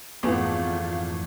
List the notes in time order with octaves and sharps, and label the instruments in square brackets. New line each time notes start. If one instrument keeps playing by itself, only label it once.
[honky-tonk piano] G#1 A3 [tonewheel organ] F2 E3 [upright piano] B3 G#4 B4 [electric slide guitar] F4